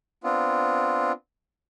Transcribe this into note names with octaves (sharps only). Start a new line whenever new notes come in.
B3 C4 D4 F4